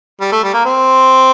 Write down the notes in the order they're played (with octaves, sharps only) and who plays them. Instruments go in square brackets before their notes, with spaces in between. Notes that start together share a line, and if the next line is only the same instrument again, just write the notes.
[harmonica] G3
A3
G3
A#3
C4